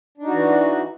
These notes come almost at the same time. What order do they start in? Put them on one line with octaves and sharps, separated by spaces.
D4 D#4 F#4 E3